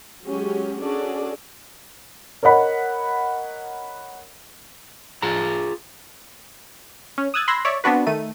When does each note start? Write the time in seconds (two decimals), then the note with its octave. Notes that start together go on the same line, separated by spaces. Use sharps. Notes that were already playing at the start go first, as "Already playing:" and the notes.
0.23 F#3 G#3 C#4 G4
0.81 C#4 D4 F#4 G#4 A4 D5
2.43 A#4 C#5 D#5 F#5 B5
5.22 F4 G#4 A#5
7.18 C#4
7.34 D#6 E6 F#6 G#6 A6
7.48 B5 C6 E6 F#6 G#6 A#6
7.65 C#5 D5 E5
7.84 B3 C4 D4 F#4 B4
8.07 D#3 A3 D#7